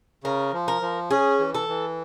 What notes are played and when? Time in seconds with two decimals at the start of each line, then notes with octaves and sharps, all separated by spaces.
0.24 C#3 A#4
0.53 F3
0.68 A#4
0.82 F3
1.11 C#4 G#4
1.39 E3
1.54 A4
1.68 E3